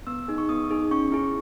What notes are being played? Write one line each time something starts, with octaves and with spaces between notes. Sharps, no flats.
B3 E6
D#4 G#4
C#6
B3 D#6
D#4 G#4
C#4 C#6
E4 G#4